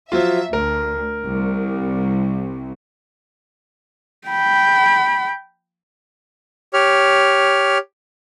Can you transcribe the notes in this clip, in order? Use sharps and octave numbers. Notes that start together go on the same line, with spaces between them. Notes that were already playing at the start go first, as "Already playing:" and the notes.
F3 F#3 F4 E5
D2 A#4
C2
G5 B5
G4 C#5 F6